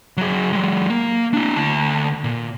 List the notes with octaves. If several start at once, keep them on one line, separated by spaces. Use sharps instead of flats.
F#3 G#4
F#3 G#3
A#3
D4 E4
D2 A5
A#2